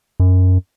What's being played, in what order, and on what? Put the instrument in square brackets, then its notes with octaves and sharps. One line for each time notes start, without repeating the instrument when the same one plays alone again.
[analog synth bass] F#2